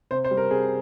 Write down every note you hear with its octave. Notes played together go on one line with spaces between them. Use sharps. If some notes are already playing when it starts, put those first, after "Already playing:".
C3 C5
C5
G3
A#4
C3 G#4